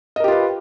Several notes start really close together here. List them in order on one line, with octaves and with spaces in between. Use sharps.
D#5 A#4 G4 F4 B4